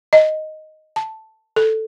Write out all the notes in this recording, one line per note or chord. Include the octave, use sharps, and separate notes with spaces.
D#5
A5
A4